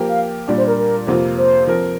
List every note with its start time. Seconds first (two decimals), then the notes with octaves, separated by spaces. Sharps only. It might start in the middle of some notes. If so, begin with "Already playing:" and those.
Already playing: F3 A#3 G4 A#4
0.08 F5
0.48 A#2 G3 D4 D5
0.58 C5
0.67 A#4
0.78 A#4
1.07 F2 C3 A#3 F4
1.37 C5
1.67 F3 C4 A#4